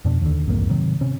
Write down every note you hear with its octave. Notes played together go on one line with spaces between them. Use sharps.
F2 B2 D4
D#2 D3
B1 F2 G#2 A#3
G#2 C3 D#3 F#3
C3 C#4